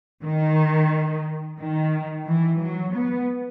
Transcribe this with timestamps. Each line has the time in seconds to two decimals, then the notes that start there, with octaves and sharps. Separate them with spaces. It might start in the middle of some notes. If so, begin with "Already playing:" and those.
0.23 D#3
1.59 D#3
2.27 E3
2.61 F#3
2.95 B3